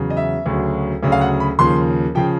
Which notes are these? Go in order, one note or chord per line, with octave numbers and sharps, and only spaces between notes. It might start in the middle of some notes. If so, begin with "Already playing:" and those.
Already playing: E2 C#3 F#3
D#5
E5
D2 C#3 F#3
D2 C#3 F#3
F5
F#5
B5
D#2 C#3 F3 C6
C#3 F3 G5